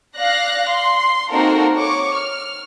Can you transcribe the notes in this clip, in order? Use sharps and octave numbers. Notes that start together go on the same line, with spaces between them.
D5 F5 F#6 A#6
C6
A#3 C4 D#4 F#4 A4 A#4
C#5 C#6 D6
F6